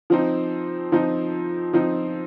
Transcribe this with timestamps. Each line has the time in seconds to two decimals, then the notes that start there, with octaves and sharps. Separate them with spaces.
0.10 F3 C4 D#4
0.92 F3 C4 D#4
1.73 F3 C4 D#4